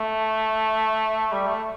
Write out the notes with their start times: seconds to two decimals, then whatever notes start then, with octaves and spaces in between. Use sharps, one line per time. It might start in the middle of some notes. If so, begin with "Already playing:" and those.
Already playing: A3
1.32 G3
1.47 A3